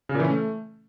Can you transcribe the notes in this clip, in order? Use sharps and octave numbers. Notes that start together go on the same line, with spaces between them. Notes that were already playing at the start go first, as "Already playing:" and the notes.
C#3
A#2
E3
C#4
A3